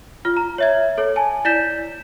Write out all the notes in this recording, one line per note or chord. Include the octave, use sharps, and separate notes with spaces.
F4 F6
A#5
C#5 E5 G#6
A4 C#5
G#5 A5
E4 D5 G6 B6 E7